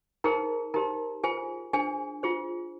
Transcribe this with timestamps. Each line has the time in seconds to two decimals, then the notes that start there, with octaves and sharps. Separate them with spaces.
0.24 D#4 G#4 A#4 C5 A#5
0.74 D#4 G4 A#4 C5 A#5
1.24 F4 G#4 C5 G#5
1.73 D4 G#4 C5 G#5
2.23 F4 G#4 C5